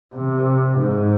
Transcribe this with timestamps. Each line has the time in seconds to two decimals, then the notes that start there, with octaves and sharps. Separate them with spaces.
0.15 C3
0.78 G#2